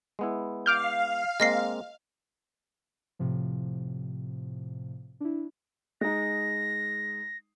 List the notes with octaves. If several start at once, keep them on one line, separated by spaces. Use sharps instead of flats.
G#3 B3 E4
F5 D6 F6 G6
G#3 A#3 C4 D#5 A#6 C7
A2 C3 F3
D4 E4
G#3 D#4 A#6